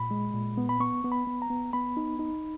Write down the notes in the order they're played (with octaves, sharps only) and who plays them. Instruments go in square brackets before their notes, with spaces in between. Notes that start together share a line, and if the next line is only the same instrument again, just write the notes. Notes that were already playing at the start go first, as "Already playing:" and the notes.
Already playing: [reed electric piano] A#2 B5
G#3
A#2
B3
B5
B3 C#6
B3
B5
B3
A#5
B3
B3 B5
D#4
D#4